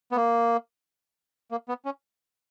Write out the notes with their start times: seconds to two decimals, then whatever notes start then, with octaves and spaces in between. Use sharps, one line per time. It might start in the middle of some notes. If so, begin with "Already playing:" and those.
0.12 B3
0.16 A#3
1.51 A#3
1.69 B3
1.85 C#4